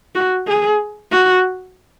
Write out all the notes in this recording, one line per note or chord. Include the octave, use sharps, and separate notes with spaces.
F#4
G#4
F#4